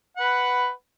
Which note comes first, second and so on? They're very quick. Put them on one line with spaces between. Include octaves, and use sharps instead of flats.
F#5 B4 B5